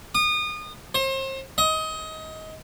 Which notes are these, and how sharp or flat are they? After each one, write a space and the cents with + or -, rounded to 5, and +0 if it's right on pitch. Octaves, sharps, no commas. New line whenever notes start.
D#6 -30
C5 +35
D#5 +25